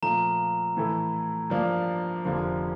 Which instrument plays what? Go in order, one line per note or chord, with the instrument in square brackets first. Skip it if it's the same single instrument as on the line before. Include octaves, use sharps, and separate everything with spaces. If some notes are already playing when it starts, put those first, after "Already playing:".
[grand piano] A#2 F3 A3 [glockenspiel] A#5
[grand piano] A2 E3 A3 E4 A4
G2 F3 A#3 D4
F1 F2 D3 F3 A#3